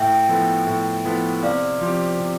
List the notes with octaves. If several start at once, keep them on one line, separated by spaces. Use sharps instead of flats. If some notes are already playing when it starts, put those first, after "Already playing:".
Already playing: A2 E5 G5
F3 B3 E4 A4
A2
F3 B3 E4 A4
C3 D5 F5
F3 C4 G4
C3